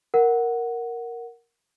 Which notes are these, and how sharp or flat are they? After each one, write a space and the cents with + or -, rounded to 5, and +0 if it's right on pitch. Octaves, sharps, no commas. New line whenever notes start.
A#4 +0 F#5 +0